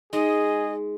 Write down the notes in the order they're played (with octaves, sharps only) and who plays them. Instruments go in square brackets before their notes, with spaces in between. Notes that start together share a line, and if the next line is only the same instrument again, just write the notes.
[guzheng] G#3 [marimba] D#4 [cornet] G#4 [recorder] D#5